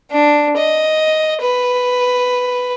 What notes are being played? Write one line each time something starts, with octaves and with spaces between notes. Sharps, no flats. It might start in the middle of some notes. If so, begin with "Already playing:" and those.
D4
D#5
B4